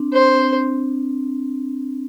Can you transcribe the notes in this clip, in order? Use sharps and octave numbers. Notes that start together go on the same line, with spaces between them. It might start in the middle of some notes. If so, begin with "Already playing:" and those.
Already playing: C4 D4
C4 C5
C4